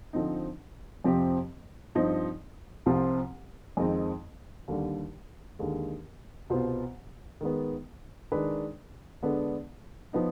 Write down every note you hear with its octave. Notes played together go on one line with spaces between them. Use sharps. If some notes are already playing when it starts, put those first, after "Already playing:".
D3 F3 C4 D#4
F2 C3 F3 C4 G4
G2 F3 C4 D#4
C2 C3 F3 C4 F4
F2 D#3 G#3 C4 D#4
D#2 D3 G3
D#2 D3 G#3
C2 B2 B3 F4 C5
D#3 G#3 B3
D#3 G#3 D4 G#4 B4
D3 G#3 B3 D4
F3 B3 D#4